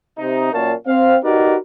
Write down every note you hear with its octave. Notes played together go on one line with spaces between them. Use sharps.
C3 D#4
F#2 A#2 A#4 C#5 F5 A5
C4 F5
D#4 F#4 G4 A#4 B4 D5